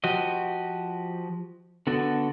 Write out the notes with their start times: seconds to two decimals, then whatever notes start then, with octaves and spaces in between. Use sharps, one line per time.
0.04 F3 F#4 G4 D#5
1.87 D3 B3 F#4 A4